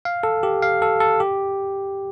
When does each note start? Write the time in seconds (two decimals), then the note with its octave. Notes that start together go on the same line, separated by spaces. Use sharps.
0.05 F5
0.23 A4
0.43 G4
0.63 F5
0.82 A4
1.00 A4
1.20 G4